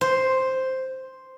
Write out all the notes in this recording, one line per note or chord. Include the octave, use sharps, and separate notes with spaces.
C5